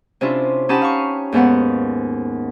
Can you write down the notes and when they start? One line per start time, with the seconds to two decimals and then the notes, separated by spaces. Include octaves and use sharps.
0.21 C3 C#4 D4 E4 F4
0.69 C#4 D#4 G4 F#5 A5 B5
0.82 F5 C#6
1.32 D#2 G#2 B3 F#5